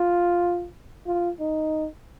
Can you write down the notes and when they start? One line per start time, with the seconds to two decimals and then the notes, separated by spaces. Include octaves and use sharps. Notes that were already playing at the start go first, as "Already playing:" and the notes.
Already playing: F4
1.06 F4
1.40 D#4